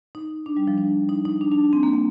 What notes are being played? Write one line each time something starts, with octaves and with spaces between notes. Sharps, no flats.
D#4
D4
G3
F3
D4
D#4
D#4
D4
D4
C4
A#3
A#3